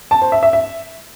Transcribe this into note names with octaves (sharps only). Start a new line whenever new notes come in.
A5
C5
E5
E5
E5